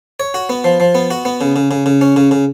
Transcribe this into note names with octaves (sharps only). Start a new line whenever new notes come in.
C#5
F#4
B3
F3
F3
B3
F#4
B3
C#3
C#3
C#3
C#3
C#4
C#3
C#3